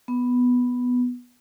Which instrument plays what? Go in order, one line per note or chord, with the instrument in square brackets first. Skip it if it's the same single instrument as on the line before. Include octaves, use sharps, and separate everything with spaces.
[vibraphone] B3